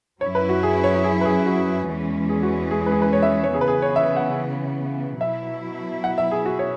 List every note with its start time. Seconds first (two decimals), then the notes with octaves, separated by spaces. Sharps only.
0.21 F#2 F#3 C#4 E4 C#5
0.35 B4
0.49 F#4
0.63 G#4
0.84 C#5
1.04 G#4
1.21 B4
1.25 G#4
1.46 F#4
1.88 E2 E3 G#3 C#4
2.29 G#4
2.43 F#4
2.71 G#4
2.81 G#4
2.86 B4
2.92 G#4
3.02 B4
3.13 C#5
3.23 E5
3.44 C#5
3.54 C#3 E3 B3 G#4
3.61 B4
3.68 G#4
3.82 C#5
3.96 E5
4.16 F#5
5.20 B2 F#3 E4 E5
6.04 F#5
6.18 E5
6.31 G#4
6.46 F#4
6.59 C#5